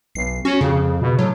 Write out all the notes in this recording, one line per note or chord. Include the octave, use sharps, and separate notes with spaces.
B1 C7
C#4 F#4
F2 C#3
B2
A2 F#3